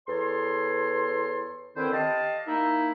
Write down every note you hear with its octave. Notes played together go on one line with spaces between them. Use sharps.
E2 A4 C#5 C6
D3 D#3 C4 E4 B4 C5
G4 D5 D#5 F5 A5
A#3 D#4 E4